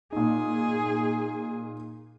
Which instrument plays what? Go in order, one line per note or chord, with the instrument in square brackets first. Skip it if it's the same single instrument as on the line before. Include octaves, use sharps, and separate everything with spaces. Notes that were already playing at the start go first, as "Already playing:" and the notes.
[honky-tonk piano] A#2 D#4 [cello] G#4